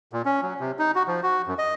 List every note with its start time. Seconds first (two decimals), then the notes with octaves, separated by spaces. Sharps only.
0.13 A#2
0.25 C#4
0.43 F#3
0.60 C3
0.79 D#4
0.95 F#4
1.08 F3
1.23 F#4
1.47 F#2
1.58 D#5